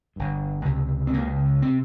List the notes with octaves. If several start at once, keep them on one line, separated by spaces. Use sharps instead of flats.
G1 G2
C#2 C3
C4
C#2 C#3 A#3
C3 C4